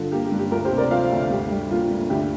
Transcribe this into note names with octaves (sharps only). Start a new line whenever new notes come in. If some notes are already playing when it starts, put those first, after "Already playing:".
Already playing: G2 D3 F4
A#3 G4
G4
G2
G4
D2 F4 A#4
G4 C5
C3
A#4 D5
F3 C5 F5
D2
G2 G4
G3
A#3 F4
G2
D2 G4